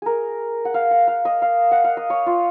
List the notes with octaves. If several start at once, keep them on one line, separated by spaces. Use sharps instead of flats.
G#4 A#4
F#5
F5
F#5
F5
D#5
F5
F#5
F5
D#5
C#5
F4